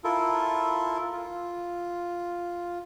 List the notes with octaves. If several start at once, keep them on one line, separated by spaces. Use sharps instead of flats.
E4 F4 A4 A#4
F4